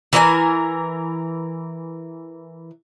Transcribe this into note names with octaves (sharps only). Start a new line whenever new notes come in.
E3 A#4 D#5 G#5